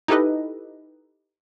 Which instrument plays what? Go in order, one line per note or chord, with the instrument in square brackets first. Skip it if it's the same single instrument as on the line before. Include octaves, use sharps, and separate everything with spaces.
[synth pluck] D#4 E4 G4 A4 B4 D#5